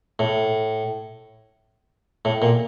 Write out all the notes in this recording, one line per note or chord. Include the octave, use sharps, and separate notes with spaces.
A2
A2
A#2